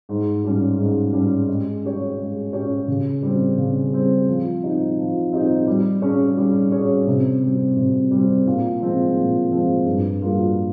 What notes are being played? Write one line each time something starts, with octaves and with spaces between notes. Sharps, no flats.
G#2
G3 C#4
G#2
G3 C#4
G#3
C#4 G4 C#5
G#3
C#4 G4 C#5
C#3
G3 C4
C#3
G3 C4
F3
C4 D#4 G4
F3
C4 D#4 G4
G3
C#4 G#4 C#5
G3
C#4 G#4 C#5
C3
G3 C4
C3
G3
C4
A#2
F3 G#3 C4
A#2
F3 G#3 C4
G2
G3 A#3 F4 G#4